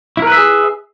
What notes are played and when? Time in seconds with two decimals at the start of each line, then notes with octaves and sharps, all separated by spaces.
0.17 E4
0.22 A#4
0.27 B4
0.32 E5
0.37 G#4